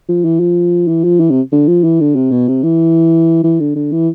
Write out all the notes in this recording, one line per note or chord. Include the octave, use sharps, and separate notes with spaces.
F3
E3
F3
E3
F3
E3
C3
D3
F3
E3
D3
C3
B2
C3
E3
E3
D3
D3
E3